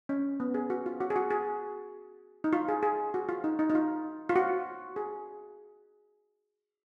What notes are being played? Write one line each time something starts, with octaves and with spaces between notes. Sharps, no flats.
C#4
B3
G#4
F#4
F4
F#4
G#4
F#4
G#4
D#4
F4
G#4
G#4
F#4
F4
D#4
D#4
D#4
F4
F4
F#4
G#4